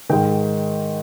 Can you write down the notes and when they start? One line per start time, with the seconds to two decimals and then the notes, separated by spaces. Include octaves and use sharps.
0.10 G#2 D#3 G5